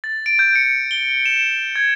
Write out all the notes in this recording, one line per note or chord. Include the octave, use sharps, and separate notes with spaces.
A6
D7
G6
C#7
G7
E7
G#6